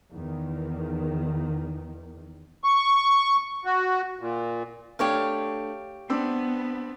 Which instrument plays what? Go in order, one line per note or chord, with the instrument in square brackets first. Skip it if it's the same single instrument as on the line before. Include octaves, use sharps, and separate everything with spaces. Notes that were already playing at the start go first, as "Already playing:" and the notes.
[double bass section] E2 D#3
[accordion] C#6
F#4
A#2
[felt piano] A3 D4 [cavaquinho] G4 C#5 F5
[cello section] B3 [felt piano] C4 D4 E6